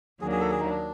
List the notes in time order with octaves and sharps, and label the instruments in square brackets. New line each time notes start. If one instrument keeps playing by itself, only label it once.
[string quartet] D#2 D#3 F#3 A#3 D4 [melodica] G#4
[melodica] G#4
A4
G#4
D#4
D4